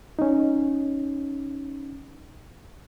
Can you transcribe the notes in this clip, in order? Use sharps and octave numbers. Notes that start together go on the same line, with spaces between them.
C#4 D#4